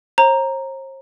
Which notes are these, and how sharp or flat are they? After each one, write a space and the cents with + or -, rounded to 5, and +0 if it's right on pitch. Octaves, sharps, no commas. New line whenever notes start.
C5 +45 A#5 +0